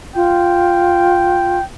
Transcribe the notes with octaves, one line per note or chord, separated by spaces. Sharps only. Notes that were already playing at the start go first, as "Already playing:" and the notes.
F4 G5